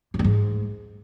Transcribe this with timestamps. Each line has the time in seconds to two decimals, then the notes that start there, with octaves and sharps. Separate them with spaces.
0.14 A2
0.19 G2
0.24 G#2